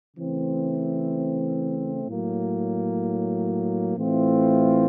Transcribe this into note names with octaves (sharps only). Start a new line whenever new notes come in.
C#3 E3 A3 C4
A2 F#3 A#3
A2 E3 A3 C4 F4